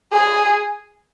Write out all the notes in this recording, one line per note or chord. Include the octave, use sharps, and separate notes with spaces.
G#4